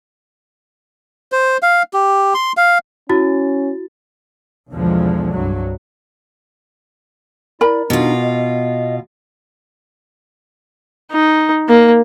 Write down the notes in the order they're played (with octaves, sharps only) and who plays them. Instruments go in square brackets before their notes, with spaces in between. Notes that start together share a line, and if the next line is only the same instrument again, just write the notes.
[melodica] C5
F5
G4
C6
F5
[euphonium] C#4 [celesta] E4 F#4 A6
[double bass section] B1 E2 D3 F3 G#3
C2 G2 F#3
[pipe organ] E4 D5 [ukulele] A#4 B5
[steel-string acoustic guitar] B2 F4 [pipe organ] D4 D#4
[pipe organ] D#5
[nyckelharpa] D#4
A#3